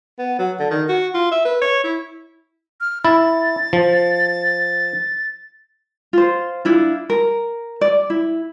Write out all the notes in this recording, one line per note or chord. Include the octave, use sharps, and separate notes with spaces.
B3
F#3
D3
D#3
F#4
F4
E5
B4
C#5
E4
F6
E4 A6
F3
F4 C5
D4 E4 F4
A#4
D5
E4